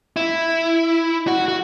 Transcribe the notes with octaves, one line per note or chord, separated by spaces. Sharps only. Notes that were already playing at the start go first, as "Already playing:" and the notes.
E4
F#4
F#4